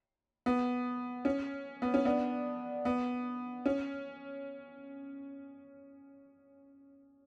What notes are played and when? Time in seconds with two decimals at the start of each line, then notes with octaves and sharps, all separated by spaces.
0.46 B3
1.25 C#4
1.82 B3
1.94 C#4
2.05 B3 D4
2.85 B3
3.66 C#4